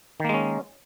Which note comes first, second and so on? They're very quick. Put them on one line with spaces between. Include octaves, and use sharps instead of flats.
D#3 A#3 G#3 C#4